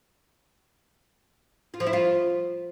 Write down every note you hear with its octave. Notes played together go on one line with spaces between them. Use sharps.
F4
F3
E4
F4